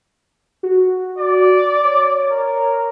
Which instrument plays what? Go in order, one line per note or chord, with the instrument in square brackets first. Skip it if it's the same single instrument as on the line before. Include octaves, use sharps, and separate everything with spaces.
[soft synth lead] F#4
[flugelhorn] D5
[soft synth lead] C#5
[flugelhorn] A#4